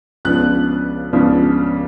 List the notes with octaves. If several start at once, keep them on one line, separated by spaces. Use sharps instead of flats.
C#2 C#3 F3 B3 D4 F#6
C#2 C#3 F3 B3 D4